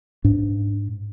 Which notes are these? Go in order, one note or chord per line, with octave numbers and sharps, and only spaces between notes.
G#2 D4